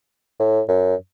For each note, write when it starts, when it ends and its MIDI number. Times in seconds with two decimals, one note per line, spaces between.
0.39 0.62 45
0.69 0.95 42